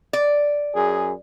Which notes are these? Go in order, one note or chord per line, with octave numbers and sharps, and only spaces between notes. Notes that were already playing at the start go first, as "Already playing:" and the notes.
D5
F#2 G#4